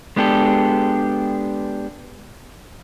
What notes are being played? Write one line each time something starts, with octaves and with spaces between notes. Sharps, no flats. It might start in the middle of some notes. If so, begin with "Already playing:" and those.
G#3 B3 D4 G4 A4